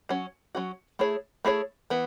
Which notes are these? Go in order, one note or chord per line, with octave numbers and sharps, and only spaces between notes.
F#3 C#4 F#4
F#3 C#4 F#4
A3 E4 G#4 C#5
A3 E4 G#4 C#5
E3 B3